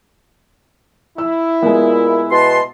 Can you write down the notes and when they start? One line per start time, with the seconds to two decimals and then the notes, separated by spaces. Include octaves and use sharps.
1.18 E4 E6
1.63 A#2 G#3 B3
2.31 B2 B4 A5 C6